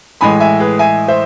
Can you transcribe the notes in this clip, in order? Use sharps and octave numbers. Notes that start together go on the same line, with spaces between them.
A2 E3 G#3 G#5 B5
E5 G#5
G#4 B4
E5 G#5
C5 E5